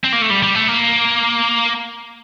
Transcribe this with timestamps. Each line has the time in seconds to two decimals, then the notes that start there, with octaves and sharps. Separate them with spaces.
0.04 C4
0.12 A#3
0.22 A3
0.30 G3
0.43 G3
0.55 A3
0.68 A#3